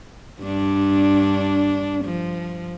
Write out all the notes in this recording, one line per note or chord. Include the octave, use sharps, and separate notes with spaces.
G2 D4
F3